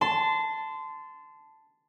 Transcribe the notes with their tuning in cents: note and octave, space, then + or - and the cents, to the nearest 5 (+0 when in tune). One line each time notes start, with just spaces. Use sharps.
A5 +0 C6 -25